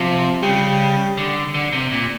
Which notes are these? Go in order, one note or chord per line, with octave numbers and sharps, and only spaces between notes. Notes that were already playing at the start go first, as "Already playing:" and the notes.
Already playing: C3 F3
C#3 G3
D3
D3
C3
A#2